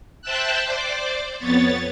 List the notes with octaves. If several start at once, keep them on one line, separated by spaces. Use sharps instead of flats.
C5 E5 G5 A5 E6 F#6
C5 D5 D6
F2 B3 C#5 A6